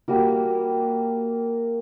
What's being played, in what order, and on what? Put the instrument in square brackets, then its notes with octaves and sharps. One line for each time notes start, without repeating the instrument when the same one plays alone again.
[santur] G3 A#3 F#4 A#4